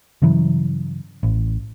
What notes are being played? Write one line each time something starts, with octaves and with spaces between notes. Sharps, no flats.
G2 C#3 E3 F#3
A1